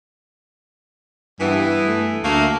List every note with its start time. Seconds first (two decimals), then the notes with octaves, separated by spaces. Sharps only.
1.40 G2 E3 B3
1.87 A3
2.24 D2 A3 A#3